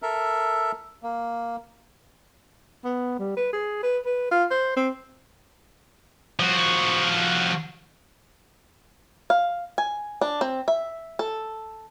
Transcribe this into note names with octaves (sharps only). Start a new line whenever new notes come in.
A4 A#4 E5
A#3
B3
G3
B4
G#4
B4
B4
F4
C5
C4
F3 F#4
F5
G#5
D4
C4
E5
A4